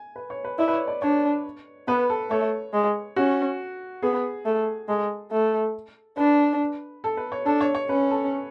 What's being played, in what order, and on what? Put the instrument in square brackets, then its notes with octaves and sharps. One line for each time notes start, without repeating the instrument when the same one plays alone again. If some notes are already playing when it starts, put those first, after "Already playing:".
Already playing: [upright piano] G#5
B4
C#5
B4
[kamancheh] E4 [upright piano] D5
[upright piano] B4
C#5
D5
[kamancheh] D4 [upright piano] C#5
[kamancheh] B3 [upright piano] B4
[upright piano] A4
[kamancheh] A3 [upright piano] C#5
[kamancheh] G#3
[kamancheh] C#4 [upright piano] F#4
[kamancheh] B3 [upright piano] G#4
[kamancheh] A3
[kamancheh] G#3 [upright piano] A4
[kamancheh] A3
[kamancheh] D4 [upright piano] B4
[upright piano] A4
B4
C#5
[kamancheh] D4 [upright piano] A4
[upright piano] C#5
C#5
[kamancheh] C#4 [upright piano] B4
[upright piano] A4